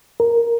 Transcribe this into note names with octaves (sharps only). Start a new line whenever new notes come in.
A#4